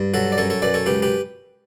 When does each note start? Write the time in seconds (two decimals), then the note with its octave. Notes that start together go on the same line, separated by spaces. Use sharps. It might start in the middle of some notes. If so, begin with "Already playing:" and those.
Already playing: G2
0.14 F#3 F#4 A4
0.32 D5
0.38 F#2 A4 C#5
0.50 A4 C#5
0.62 F#2 B4 D5
0.74 A4 C#5
0.86 C#2 G4 B4
1.02 G4 B4